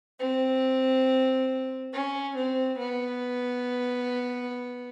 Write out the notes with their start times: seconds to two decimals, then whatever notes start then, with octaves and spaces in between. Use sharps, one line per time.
0.18 C4
1.92 C#4
2.34 C4
2.78 B3